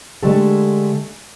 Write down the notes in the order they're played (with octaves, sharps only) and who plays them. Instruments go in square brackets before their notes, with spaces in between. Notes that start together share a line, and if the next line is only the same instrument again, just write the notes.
[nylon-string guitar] D3 G#3 A3 G4 A4